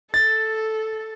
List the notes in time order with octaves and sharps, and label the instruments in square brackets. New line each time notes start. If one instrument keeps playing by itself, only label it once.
[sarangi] A4 [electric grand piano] A6